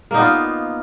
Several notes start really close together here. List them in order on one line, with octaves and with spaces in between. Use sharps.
A#3 D#4 B3 F4